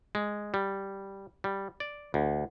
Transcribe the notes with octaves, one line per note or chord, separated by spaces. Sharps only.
G#3
G3
G3
D5
D2